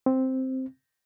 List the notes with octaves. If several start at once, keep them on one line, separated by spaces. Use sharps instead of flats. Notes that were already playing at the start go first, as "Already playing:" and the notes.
C4